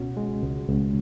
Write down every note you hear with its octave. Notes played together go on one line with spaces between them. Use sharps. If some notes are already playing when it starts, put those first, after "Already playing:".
Already playing: C#2 B2 C#4 F#4
G#3
C#2
C#2